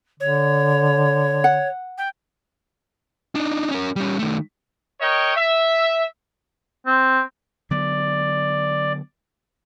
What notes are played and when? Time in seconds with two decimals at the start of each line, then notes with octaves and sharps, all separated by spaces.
0.20 D3 C#5
1.44 F#5
1.97 G5
3.35 D4 D#4
3.71 C#4 A#4
3.96 G3 C#4
4.19 D#3 A3
5.01 A#4 C#5 D#5 G5
5.35 E5
6.86 C4
7.71 D3 F#3 B3 D5